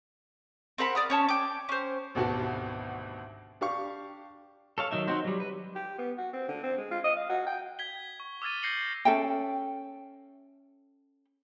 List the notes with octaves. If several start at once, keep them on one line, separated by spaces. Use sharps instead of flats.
C4 A#4 F#5 B5
D5 D#6 F6
C#4 C#5 A5
G5 D6
C#4 C5
G#1 D2 B2 F#4 G4 A5
D4 G4 F5 C#6
A4 C#5 F5
D#3 F#3 D#4 E5
C4 D#4 F#4 C5
F#3 G3
B4
G4
B3
F#4
C4
D3
C4
G#3
F4
D#5
F5
F#4
G5
G#6 B6 G7
C#6
D6 E6 F6 G#6 A6 D#7
G6 A#6 C7 C#7 F#7
C#4 A4 E5 G5